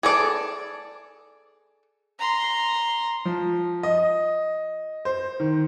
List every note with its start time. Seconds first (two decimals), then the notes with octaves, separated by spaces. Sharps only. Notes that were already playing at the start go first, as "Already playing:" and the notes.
0.03 G#4 A4 D5
2.19 A#5 C6
3.25 F3
3.83 D#5
5.05 C5
5.40 D#3